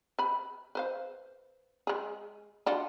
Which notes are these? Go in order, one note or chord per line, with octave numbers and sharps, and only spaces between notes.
B4 B5
B4 C5 F5
G#3 G#4
D4 F4 F#4